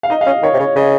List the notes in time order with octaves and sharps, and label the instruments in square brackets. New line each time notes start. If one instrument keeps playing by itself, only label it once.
[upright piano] F5
[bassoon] D#4 [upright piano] D#5
[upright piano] F5
[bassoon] C#4 [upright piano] D#5
[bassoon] D#3 [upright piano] C#5
[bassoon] C3
[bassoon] C#3 [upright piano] C#5
[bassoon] C#3 [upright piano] D#5